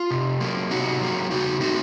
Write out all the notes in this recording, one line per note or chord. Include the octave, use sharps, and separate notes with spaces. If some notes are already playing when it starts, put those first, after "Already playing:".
Already playing: F4
C3
F#3 A#3
C3 D#4 F#4
F#3 A#3
C#3 D#4 F#4
A3 C4 D#4 F#4